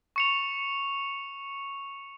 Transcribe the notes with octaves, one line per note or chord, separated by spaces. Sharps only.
C#6 C#7 F7